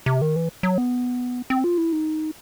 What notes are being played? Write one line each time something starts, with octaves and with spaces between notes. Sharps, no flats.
C3
D#3
E3
F#3
B3
C4
F4
E4
D#4